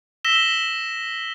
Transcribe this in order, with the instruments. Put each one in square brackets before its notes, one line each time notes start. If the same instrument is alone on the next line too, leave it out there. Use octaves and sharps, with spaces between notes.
[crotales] E6 A#6 B6 E7 G7